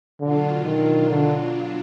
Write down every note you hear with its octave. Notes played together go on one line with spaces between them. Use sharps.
B2 D3 F#3 D4 F4
D#3
D3